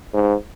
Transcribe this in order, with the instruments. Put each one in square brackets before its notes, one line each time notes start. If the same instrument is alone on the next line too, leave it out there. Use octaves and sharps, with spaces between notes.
[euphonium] G#2